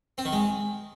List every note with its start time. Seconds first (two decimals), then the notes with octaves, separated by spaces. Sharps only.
0.18 C4
0.25 D#3
0.33 G#3